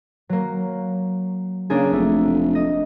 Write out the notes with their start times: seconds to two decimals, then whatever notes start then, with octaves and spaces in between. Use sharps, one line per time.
0.29 F#3 A#3
1.70 C#3 A#3 D4 G#4
1.93 F1 A3
2.55 D#5